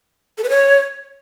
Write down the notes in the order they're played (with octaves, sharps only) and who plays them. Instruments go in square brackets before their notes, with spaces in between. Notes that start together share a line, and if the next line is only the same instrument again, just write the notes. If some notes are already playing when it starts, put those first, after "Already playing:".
[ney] A4
B4
C#5